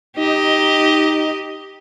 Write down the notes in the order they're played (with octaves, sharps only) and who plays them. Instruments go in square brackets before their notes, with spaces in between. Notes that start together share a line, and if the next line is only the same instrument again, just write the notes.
[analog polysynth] D#4 [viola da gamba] G4 D#5